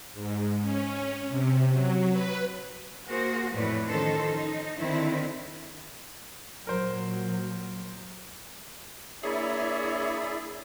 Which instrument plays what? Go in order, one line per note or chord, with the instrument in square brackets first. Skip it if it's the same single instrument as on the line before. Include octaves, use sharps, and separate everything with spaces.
[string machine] G#2
C#4
C3
F#3
B4
[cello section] A#3 F#4 G#4 A#4 C5
F2 A2 E3 B4 C#5 D5
D#3 F3 C#4 D#4 A4 C5
D#4
D3 D#3 C4 E4
[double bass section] A#2 F#3 [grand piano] A#4 C5
[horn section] A#3 D4 C#5 [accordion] E4 D5 E5 [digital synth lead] G#4